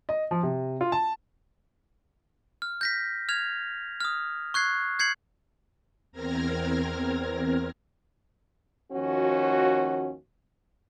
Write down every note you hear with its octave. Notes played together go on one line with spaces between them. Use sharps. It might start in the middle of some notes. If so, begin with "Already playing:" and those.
D#5
F3
C3
F4
A5
F6
G6 A#6 B6
F6 G#6 F7
D#6 F6
C#6 F#6 G#6 C7
G6 G#6 C7 C#7 F#7
E2 C4 A#4 F6 G#6 A#6
D#2 F3 C#4 F#4